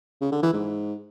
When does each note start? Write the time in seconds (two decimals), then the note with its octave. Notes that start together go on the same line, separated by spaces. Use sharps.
0.21 C#3
0.32 D3
0.43 E3
0.53 G#2